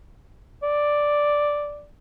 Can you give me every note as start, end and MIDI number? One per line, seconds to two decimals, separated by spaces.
0.63 1.86 74